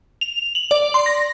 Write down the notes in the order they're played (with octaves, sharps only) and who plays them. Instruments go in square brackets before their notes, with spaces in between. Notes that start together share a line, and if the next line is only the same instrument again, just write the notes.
[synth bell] F7
F#7
D5
C6
A#6